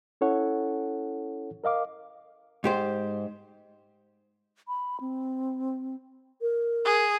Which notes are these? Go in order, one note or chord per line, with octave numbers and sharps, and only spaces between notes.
C#4 E4 A4 C#5 F#5
A#4 D#5 F5 D6
G#2 G4 C5
B5
C4
A#4
G#4